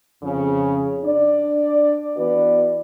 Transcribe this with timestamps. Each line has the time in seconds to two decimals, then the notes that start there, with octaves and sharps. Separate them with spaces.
0.23 F2 C#3
1.04 D4 D5
2.16 E3 B3 F#4 B4 D5